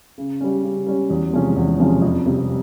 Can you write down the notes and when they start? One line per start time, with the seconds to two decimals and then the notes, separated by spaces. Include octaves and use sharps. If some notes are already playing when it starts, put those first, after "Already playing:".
0.18 C#3
0.40 G3 C#4
0.64 C#3
0.87 G3 C#4
1.10 E2
1.33 C3 F3 G#3 C#4
1.56 E2
1.79 C3 F3 G#3 C#4
2.02 F2
2.26 C3 G3